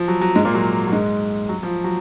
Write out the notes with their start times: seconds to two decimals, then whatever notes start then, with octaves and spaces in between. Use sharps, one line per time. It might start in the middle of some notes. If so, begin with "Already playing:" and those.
Already playing: F3
0.08 F#3
0.21 F#3
0.36 G#2 G#3
0.45 A#2 A#3
0.55 F#3
0.87 F#3
0.92 G#2 G#3
1.49 F#3
1.63 F3
1.84 F#3